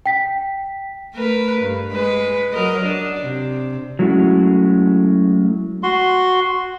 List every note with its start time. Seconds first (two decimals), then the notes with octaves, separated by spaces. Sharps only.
0.06 G5 B6
1.15 A3 A#4 B4
1.62 G2
1.93 G#3 B4
2.52 F#3 A#4 D#5
2.84 D4
3.21 C3
3.99 F#3 G#3 A3 C#4 E4 F#4
5.83 F#4 C6